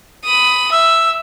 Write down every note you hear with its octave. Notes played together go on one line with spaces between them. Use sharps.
B5 D#6
E5 E6